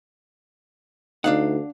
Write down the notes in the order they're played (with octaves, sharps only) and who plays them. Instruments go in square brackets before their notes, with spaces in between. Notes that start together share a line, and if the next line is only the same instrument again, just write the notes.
[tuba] D2 [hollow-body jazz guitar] D4 F5 F#5 [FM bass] D#4